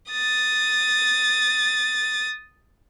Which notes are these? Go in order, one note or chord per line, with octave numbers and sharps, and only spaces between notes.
D#6 A6